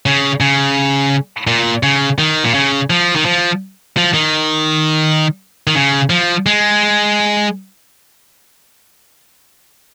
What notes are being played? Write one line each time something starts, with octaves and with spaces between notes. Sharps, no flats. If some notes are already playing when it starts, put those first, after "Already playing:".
C#3
C#3
A#2
C#3
D#3
A#2
C#3
F3
D#3
F3
F3
D#3
D#3
C#3
F3
G#3